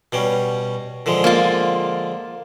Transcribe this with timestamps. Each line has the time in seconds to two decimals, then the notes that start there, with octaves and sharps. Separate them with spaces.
0.12 B2 G3 C#4
1.06 D3 F3 G#3
1.24 A#3 F4